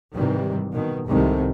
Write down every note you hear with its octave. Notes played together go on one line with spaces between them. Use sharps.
G#2 C3 D#3 E3 G3
B2 D#3
C2 G#2 C3 D#3 A3